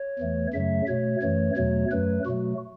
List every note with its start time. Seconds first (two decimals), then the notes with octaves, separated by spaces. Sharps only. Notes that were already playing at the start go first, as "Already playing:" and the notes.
Already playing: C#5
0.19 E2 E3 A3
0.54 F#2 C#3 F#3 A3 E5
0.88 B2 A3 C#5
1.22 F#2 E3 A3 C#5
1.57 E2 B2 F#3 A3 C#5
1.92 F#2 F#3 A3 B4
2.26 B2 F#3 A3 F#4